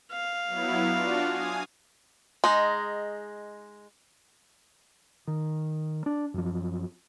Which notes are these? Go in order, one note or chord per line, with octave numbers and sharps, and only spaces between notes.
F5
F#3 B3 E4
D4 F4 F#4
G#5 D#6
G#3 D#4
D#3
D4
F#2 F3